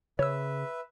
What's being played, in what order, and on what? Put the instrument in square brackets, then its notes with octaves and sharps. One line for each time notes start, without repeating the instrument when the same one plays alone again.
[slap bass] C#3 [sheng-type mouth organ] B4 E5 [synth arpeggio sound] C#5 E6